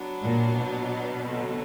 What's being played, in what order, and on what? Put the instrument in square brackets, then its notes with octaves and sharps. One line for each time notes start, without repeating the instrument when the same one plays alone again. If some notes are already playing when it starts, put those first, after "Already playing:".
Already playing: [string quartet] F#3 B3 D4
[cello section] A#2
B2
[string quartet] D3 F#3 A3 C4